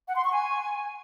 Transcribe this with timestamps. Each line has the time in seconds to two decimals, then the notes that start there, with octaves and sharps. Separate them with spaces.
0.08 F#5
0.16 C6
0.24 C#6
0.32 G#5